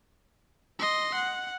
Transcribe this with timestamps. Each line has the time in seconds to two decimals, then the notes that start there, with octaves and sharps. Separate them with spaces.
0.79 D#5 C6
1.14 F#5